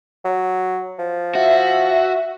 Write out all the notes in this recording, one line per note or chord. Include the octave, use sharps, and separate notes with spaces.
F#3
F3
F#4 E5